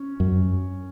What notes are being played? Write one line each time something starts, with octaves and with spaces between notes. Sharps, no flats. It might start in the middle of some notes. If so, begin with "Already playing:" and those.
Already playing: C#4
F#2